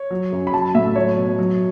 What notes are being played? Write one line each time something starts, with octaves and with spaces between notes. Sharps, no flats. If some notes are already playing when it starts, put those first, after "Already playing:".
Already playing: C#5
F#3
F#2
B5
F#3 A5
A2 E5
F#3 C#5
B2
F#3